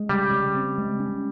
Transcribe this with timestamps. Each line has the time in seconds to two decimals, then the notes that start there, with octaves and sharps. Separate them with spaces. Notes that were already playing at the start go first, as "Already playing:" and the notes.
Already playing: G#3
0.09 C#3 G3
0.32 C#3
0.55 C4
0.78 G#3
1.00 C#4